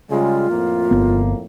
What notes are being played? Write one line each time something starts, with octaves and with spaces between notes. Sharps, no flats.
C#3 G3 G#3 F4
F2 A2 A#3
G1 B3